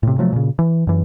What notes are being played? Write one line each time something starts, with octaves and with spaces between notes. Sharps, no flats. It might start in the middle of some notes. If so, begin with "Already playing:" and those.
A2 C3
C3 F3 F#3 A3
A#2 C#3
E3
F#2 E3